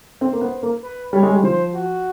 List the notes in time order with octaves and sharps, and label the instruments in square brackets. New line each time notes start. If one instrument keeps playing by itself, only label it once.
[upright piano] C4 [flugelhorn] C5
[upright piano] A#3
B3
A#3
[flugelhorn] B4
[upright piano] G3 [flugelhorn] C#5
[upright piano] G#3
G3
[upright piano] F3 [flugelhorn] C5
[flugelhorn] F#4